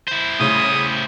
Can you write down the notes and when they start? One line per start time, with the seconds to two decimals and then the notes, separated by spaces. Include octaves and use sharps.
0.08 E4 C5
0.39 A2 C#3 C#5 D#6